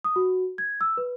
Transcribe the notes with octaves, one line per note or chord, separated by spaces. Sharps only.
D#6
F#4
G#6
E6
B4